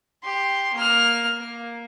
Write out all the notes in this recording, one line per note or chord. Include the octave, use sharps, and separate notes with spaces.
G4 C6
A#3 F6
A#3